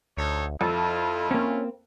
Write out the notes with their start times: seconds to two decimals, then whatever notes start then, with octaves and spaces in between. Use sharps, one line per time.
0.17 D2 D#4 A4 C#5
0.61 F2 E4 F4 A4
1.31 A#3 C4 C#4